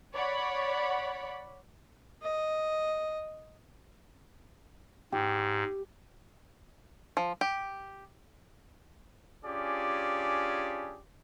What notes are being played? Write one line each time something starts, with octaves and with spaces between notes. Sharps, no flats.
C#5 D5 F#5 B5
D#5
G#2 G4
F3
G4
C#4 D4 F4 G4 G#4 D5